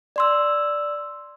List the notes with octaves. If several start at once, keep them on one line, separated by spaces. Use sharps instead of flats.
D5 C6 E6